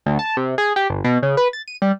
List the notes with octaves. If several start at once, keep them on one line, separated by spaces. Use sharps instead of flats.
D2
A5
C3
G#4
G4
G1
B2
C#3
B4
A6
D#7
G3